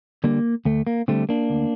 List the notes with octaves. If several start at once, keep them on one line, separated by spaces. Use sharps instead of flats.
D3 G3 A#3
D2 A3
A#3
D3 G3 A3 C4
A#3 D4
D2